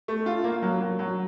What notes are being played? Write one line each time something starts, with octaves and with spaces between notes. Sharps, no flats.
A3
F4
A#3
F#3
F#3
F#3